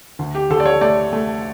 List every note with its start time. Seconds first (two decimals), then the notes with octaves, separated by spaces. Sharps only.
0.19 D2
0.35 G4
0.50 D2 A4
0.60 D5
0.66 C#5
0.81 A3 D5
1.13 A3